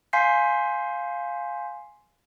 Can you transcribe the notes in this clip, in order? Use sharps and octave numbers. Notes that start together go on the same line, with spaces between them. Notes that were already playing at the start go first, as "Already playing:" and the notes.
F5 G#5 C6 G6 B6 C7